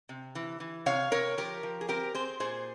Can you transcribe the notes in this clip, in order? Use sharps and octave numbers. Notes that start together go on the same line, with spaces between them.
C3
E3
E3
C3 C#5 F5
C3 A#4 C#5
F3 G4 A#4
F3
G#4
C4 G4 A#4
C4 G#4 C5
A#2 G#4 C5